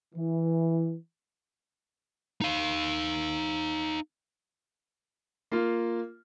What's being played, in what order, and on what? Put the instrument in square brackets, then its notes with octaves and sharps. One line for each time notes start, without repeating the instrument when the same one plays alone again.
[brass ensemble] E3
[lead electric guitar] D#4 F5
[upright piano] A#3 F4